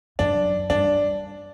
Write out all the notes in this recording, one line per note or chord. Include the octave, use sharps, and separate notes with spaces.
F#2 D4
G2 D4